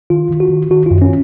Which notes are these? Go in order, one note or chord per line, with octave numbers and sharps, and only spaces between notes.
D#3 F4
D#3
F#4
D#3
D#3 F#4
F#2 F4
C#4